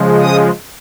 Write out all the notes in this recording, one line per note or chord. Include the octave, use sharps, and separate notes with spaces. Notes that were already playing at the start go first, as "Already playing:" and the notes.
Already playing: C#3 F3 G#3
D#6